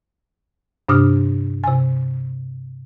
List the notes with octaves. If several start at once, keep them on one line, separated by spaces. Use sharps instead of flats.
G2 C3 D4 D#6 F6
C3 G#5